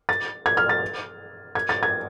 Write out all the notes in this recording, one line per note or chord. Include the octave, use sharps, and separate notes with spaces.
A6
G#6
F6
A6
G#6
A6
G#6